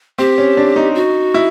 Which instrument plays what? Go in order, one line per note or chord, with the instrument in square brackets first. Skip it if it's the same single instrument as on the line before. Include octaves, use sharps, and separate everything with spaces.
[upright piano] C4 [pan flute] G4
[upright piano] C#4
D4
D#4
[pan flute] F#4
[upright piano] E4